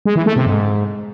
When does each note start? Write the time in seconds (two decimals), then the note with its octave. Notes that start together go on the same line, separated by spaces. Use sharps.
0.06 G#3
0.16 E3
0.26 A3
0.36 C3
0.47 G#2